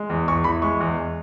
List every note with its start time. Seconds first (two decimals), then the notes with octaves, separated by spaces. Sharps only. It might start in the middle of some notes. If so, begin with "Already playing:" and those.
Already playing: G#3
0.10 E2
0.28 E2 C#6
0.44 E3 B5
0.62 G#3 C#6
0.80 E2